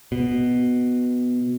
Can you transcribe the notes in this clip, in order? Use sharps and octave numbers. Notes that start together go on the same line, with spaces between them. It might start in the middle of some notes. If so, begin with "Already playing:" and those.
B2